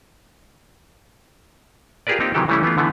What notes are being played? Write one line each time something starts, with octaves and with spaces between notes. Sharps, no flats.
F4 G4 G#4 A#4 B4 D5
A#3 C4 D#4 F4 G4
C3 D#3 E3 F#3 G4 A4
C#3 E3 G3 A3 C#4 E4
E3 A3 B3 F4
D3 E3 A3 B3